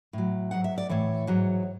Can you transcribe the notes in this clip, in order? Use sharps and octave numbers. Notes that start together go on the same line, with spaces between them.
A2 F#3
G#2 F#3 F#5
E5
D5
A2 E3 C#5
G#2 F#3